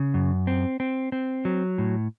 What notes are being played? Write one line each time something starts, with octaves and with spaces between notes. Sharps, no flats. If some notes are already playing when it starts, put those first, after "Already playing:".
Already playing: C#3
F#2
C4
C4
C4
F#3
A2